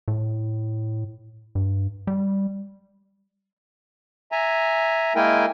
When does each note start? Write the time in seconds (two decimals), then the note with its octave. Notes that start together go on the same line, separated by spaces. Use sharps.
0.08 A2
1.55 G2
2.07 G3
4.32 E5 G#5 A#5
5.15 G#3 A#3 E4 A#4 G5 G#5